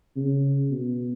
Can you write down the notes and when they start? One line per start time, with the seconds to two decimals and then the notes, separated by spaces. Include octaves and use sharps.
0.16 C#3
0.71 B2